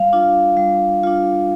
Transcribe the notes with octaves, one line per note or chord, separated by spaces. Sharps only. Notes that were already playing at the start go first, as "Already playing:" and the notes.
Already playing: G3 F5
D4 F4
G3
D4 F4